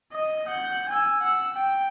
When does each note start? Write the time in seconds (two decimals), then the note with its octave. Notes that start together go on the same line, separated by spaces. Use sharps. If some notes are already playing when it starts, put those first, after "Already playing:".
0.12 D#5
0.48 F#5 G6
0.89 G#5 E6
1.21 F#5 E6
1.54 G5